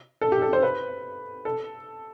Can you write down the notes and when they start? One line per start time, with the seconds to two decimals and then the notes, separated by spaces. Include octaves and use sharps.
0.21 A4
0.32 G4
0.42 A4
0.53 C5
0.63 B4
1.45 A4